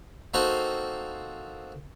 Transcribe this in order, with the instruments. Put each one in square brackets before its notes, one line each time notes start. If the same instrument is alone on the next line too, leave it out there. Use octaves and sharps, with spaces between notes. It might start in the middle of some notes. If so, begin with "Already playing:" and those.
[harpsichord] A#3 C4 D#4 F#4 A4